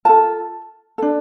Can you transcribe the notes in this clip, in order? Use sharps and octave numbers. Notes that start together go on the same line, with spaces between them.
F4 A4 A5
D4 A4